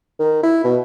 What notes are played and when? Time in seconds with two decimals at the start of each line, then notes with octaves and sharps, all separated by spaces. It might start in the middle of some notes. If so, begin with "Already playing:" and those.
0.19 D#3
0.43 E4
0.64 B2